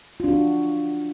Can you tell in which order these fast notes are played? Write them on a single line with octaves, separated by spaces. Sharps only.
F4 D4 F#4